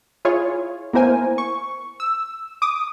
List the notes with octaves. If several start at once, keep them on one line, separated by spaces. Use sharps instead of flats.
E4 F4 G#4 C#5
A#3 B3 E4 A#4 C5 G#5
C#6
E6
D6 D#6